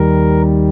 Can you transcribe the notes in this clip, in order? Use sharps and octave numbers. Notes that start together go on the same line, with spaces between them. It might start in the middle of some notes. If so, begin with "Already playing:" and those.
Already playing: D#2 D#3 G3 A#4